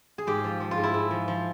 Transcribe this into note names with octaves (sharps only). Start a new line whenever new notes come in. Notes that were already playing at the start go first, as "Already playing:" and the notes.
G#4
G#2 G4
F3
F3
F4
G#2
E4
G#2
F3
F3